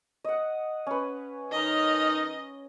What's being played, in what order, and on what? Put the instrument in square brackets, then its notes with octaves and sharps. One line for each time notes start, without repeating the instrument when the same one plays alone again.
[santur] D#5 F#5
C#4 B4
[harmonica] D#3 D#4 A#4 [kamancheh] D#5